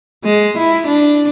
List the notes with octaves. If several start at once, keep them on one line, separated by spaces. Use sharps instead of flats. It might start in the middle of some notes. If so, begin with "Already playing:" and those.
G#3
E4
D4